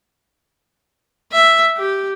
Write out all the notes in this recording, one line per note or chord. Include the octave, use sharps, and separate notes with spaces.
E5
G4